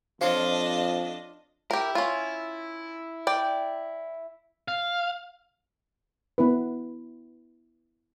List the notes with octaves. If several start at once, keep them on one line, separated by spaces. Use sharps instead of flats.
F2 D4 F4 C5 C#5 D#5 C6
E4 G4 A#4
C#4 F4
D5 G5
F5
B3 E4 B4